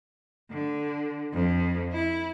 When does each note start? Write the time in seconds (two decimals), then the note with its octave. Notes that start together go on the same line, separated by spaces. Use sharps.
0.51 D3
1.33 F2
1.93 E4